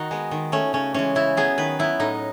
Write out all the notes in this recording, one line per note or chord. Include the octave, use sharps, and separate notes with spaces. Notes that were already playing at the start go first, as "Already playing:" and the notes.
Already playing: D#3 D#4 F#4
G#3 B3
D#3
A3 C#4
C#3 C#4
E3 G#3 C#4
C#3 E4
F#3 B3 G#4
D#3 B4
F#3 B3 E4
A2 D#4